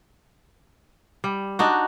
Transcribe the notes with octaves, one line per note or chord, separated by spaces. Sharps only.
G3
D4 D#4 F#4